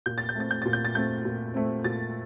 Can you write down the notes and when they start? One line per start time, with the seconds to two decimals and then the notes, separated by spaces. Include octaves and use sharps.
0.06 A#2 G6
0.18 A6
0.29 G6
0.35 A3 C4 A6
0.51 G6
0.62 A#2 A6
0.73 G6
0.85 A6
0.95 A3 C4 G6
1.25 A#2
1.54 A3 C4
1.84 A#2 A6